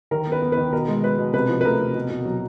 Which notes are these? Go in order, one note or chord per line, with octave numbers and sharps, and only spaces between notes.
D#3 A#4
B3
B4
B3
B4
D#3
B2 A#4
G#3
G#3 B4
B2
C3 B4
F3
B4
A3 A#4
C3
B2
B2
F#3